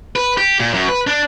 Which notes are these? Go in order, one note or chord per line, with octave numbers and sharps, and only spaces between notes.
B4
G4
A#2
F#2
B4
D4